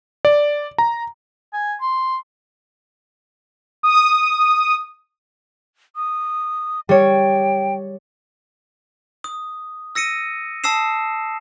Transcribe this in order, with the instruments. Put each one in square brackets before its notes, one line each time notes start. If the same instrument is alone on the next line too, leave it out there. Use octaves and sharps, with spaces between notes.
[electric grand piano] D5
A#5
[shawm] G#5
C6
[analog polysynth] D#6
[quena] D#6
[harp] G3 C#5 [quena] G5
[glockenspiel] D#6
E6 A#6 C#7 D#7
A5 D#6 E6 C7 E7